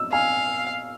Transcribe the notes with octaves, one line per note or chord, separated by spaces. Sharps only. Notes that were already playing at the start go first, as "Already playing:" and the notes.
Already playing: E6
F5 G#5